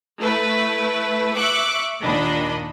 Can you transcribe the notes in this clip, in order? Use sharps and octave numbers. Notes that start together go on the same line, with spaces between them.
A3 E4 B4
E5 C#6 D6 F#6
D#2 A#2 D#3 D4 D#5 B5